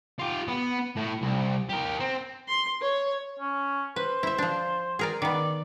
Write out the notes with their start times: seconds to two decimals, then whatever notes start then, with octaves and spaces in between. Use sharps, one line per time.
0.19 F4 G4
0.48 B3
0.96 A2
1.22 C2
1.69 G4 A#4
2.00 C4
2.48 C6
2.82 C#5
3.39 C#4
3.96 B4 C5
4.23 E4 E5
4.38 F3 D4
4.99 G#4 A#4 D5
5.22 D#3 B3 D5